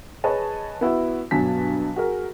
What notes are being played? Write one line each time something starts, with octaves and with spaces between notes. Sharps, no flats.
G#4 B4 C#5 D#5 A5
B3 E4 F#4
G2 B2 F#3 G#5 A5 B6
F#4 G#4 A#4